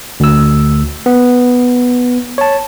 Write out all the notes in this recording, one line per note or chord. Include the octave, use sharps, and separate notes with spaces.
D2 E6
B3
C#5 A5